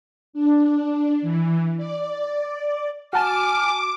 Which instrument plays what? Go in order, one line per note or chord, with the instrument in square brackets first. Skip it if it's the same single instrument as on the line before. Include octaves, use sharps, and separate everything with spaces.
[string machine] D4
D4
E3
D5
[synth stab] F#4 A5 E7 [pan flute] G#5 [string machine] D6 [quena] F6